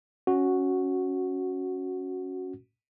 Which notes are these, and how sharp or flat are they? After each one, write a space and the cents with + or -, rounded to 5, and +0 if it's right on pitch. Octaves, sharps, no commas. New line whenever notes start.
C#4 +0 F#4 +0